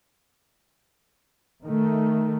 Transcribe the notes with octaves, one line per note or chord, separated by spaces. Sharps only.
D#3 A3